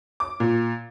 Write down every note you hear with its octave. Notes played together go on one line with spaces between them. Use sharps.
D6
A#2